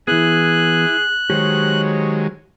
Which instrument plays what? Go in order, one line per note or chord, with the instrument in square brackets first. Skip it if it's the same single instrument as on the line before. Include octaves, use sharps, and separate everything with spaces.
[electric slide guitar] E3 B3 [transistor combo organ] E4 [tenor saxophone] G#4 [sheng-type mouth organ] F#6
[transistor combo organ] D#3 F#3 G#3 [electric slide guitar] G4 C5 [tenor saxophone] C#5